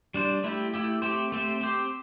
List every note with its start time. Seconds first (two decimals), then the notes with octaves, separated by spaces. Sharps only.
0.14 G3 D4 C5
0.44 A3 E4 G4
0.74 A3 E4 G4
1.02 A3 C4 G4 C5
1.32 A3 C4 G4 C5
1.61 C4 G4 C5